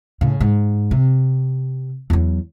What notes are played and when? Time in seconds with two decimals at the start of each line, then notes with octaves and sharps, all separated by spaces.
0.21 A2 C#3
0.41 G#2
0.91 C3
2.10 E2 F#3